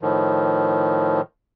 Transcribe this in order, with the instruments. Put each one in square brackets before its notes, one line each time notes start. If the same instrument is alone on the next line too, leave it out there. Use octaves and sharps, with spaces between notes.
[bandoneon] A2 D#3 F3